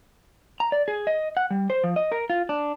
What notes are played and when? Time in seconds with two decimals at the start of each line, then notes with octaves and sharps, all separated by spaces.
0.60 A#5
0.72 D5
0.88 G#4
1.07 D#5
1.37 F#5
1.51 G3
1.70 C5
1.84 F3
1.96 D#5
2.12 A#4
2.30 F4
2.49 D4